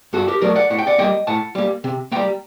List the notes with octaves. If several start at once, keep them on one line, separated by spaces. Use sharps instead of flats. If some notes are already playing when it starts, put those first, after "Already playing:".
G2 F#4 A4
G4 A#4
F#3 A3 A#4 D5
D5 F#5
A2 F#5
G5
D5 F#5
G3 A#3 D#5 G5
A2 F#5 A5
G3 A#3
C3
G3 A#3 G5 A#5